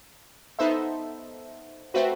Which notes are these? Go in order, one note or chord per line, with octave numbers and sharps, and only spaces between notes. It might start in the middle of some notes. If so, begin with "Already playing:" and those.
B3 D#4 A4 C5 E5
A3 C4 F#4 B4